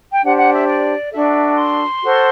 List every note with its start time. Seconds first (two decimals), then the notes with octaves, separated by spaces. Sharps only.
0.12 G5
0.22 D4 G4 C5 F#5
0.37 F#5
0.52 E5
0.67 D5
1.11 D4 F#4 A4 E5
1.56 C6
2.01 F#4 A4 C5